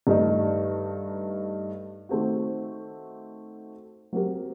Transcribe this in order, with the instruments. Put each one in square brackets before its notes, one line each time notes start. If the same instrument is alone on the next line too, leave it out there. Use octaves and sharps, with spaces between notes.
[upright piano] G2 D#3 A3 D#4
D#3 A3 C4 F#4
F#3 C4 G4 A#4